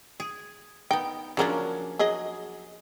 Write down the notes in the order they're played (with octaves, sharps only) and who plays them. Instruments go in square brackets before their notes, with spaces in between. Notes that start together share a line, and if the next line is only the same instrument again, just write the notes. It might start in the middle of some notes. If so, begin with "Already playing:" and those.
[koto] G#4
[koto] B3 D#4 [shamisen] G5
[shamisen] C#3 F#3 C#4 [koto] F3 A#3 D4
[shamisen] F#3 G#4 D#5